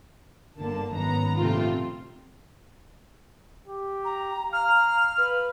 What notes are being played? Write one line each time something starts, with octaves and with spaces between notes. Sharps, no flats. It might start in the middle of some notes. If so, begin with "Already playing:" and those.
G1 D3 A#3 A5
G#1 F#2 B3 A#5
A#1 C3 A3 C4 F4
G4
A#5
F5 A#5 F6
B4